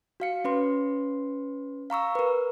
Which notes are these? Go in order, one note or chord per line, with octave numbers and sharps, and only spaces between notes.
F#4 F5 C#7
C#4 B4 C6
F5 A#5 C#6 E6
A#4 B4